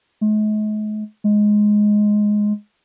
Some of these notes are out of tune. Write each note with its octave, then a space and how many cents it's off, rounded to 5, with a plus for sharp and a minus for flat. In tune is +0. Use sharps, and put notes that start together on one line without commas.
G#3 +45
G#3 +5